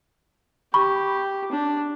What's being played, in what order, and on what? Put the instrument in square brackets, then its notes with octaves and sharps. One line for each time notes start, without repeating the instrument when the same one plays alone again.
[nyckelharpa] G4 [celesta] B5 C#6
[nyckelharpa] D4